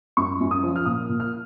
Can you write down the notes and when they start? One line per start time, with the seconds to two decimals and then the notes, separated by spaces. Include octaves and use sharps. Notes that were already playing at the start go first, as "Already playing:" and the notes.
0.17 F#2 C#6
0.41 F#2
0.51 D#6
0.64 F3
0.76 F6
0.85 A#2 D#6
1.09 A#2
1.20 F6